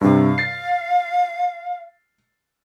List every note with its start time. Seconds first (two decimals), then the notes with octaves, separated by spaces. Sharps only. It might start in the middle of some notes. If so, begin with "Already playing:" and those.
0.01 G2 C3 F5
0.38 A6 C7